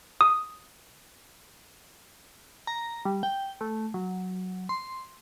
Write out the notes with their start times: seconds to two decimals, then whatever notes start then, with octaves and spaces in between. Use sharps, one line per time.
0.21 D#6
2.67 A#5
3.05 G3
3.23 G5
3.61 A3
3.94 F#3
4.69 C6